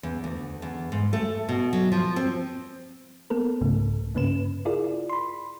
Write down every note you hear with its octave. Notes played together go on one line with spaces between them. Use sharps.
E2
D2
E2
G#2
A3
B2
F#3
F3
C4
A#3 B3 A4 A#4
C2 G#2 C#3 A3
G2 C#3 A#3 C#4 B4 E7
E4 F4 G#4 A#4 D5
B5 C6